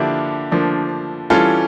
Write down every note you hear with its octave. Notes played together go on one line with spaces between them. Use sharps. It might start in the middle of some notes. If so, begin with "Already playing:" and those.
Already playing: D3 F3 A#3 D4 E4 G4
D3 F3 A#3 D4
E3 G3 C#4 F4 A4